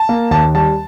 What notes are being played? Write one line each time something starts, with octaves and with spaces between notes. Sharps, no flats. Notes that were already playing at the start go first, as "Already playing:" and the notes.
Already playing: A5
A#3
D#2 A5
G3 A5